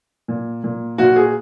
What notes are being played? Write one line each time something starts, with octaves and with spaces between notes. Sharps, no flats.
A#2
A#2
A#2 F#4
G#4